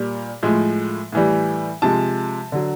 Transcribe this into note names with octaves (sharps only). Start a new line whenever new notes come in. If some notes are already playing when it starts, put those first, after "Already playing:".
Already playing: A#2 G3
A2 F3 G#3
A2 E3 G3
C3 F3 G#3 A5
D3 F#3